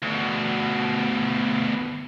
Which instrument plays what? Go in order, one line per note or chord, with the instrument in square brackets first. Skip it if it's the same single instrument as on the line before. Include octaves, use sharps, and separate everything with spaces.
[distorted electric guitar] D2 B2